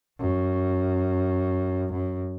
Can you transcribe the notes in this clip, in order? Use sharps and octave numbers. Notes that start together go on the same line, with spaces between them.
F#2
F#2